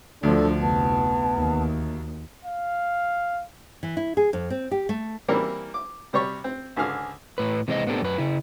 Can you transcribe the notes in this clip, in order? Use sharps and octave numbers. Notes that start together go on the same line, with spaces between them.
D2 D3 F3 D4 A4
F1 B3 A5
D#2
F5
E3
E4
G#4
F2
C4
G4
A3
E3 G3 A#3 C4 E4 A#4
D6
C3 G3 C#5 C#6
C4
C#2 G#2 D3 G#4 F5 F6
A2 B4
C3 E3 G#3 C4 D4 D#5
A2 B3 C4 D4 G4 A4
F#2 B4
C#3 E4